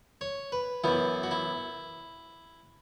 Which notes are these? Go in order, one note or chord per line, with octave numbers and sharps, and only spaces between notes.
C#5
B4
F#2 E3 B3 E4
F#4
E4